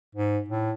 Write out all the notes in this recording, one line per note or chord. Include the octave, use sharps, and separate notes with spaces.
G#2
A2